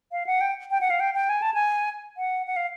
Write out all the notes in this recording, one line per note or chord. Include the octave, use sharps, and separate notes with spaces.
F5
F#5
G5
G5
F#5
F5
G5
G5
G#5
A5
G#5
F#5
F#5
F5